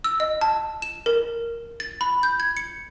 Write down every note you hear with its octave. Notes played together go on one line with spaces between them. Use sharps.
E6
D#5
A5
E7
A#4
A6
B5
G6
G#6
C#7